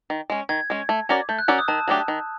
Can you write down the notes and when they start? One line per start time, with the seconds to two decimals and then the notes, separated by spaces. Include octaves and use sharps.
0.10 D#3
0.30 G#3 C#4
0.49 D#3 G#6
0.70 G#3 C#4
0.89 A3
1.09 C#4 F#4 A#4 D5
1.29 A3 G6
1.39 F#6
1.48 C#4 F#4 A#4 D5 E6
1.58 D#6
1.68 D#3 A5
1.88 F#3 A3 D4 G4
2.08 D#3